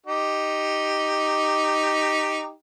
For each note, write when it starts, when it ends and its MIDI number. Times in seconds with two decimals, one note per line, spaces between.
0.06 2.50 63
0.06 2.50 67